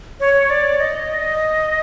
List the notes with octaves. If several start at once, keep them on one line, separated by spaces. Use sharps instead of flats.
C#5
D5
D#5